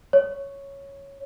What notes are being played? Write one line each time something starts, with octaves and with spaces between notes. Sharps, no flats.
C#5